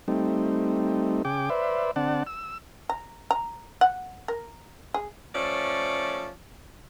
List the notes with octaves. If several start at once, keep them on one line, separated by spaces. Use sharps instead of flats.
G3 A3 C4 D#4
C#3 G#4 G5 D6
B4 C5 D5 E5
D3 C4 D5 F#5 A5
E6
A#5
A#5
F#5
A#4
G#4
F3 A3 C#4 C5 D5